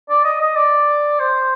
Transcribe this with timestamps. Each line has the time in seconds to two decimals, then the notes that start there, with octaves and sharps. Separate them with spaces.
0.09 D5
0.24 D#5
0.40 D#5
0.56 D5
1.19 C5